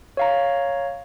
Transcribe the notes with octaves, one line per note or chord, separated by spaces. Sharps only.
C#5 F5 A#5